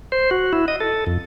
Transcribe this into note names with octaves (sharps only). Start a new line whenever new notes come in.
C5
F#4
E4
D#5
A4
F2